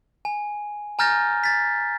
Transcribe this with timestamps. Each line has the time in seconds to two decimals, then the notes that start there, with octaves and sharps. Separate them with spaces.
0.25 G#5
0.99 G#5 A#5 F6 G6 A6 A#6
1.44 A6 B6